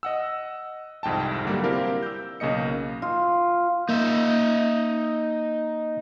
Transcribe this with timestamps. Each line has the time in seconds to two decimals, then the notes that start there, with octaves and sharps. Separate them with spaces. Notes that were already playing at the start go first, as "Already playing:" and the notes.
0.03 D#5 F#5 E6
1.03 C2 F2 G#2 G5 A5
1.45 D3 F#3 G3 A#3
1.63 C4 E4 G4 A#4 D5 F5
2.03 E6 G6
2.40 B1 C#3 A#3 D#5 C#7
3.02 F4
3.89 A#3 D#4 E5